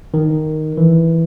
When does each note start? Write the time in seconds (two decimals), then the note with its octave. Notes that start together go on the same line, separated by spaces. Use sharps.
0.14 D#3
0.77 E3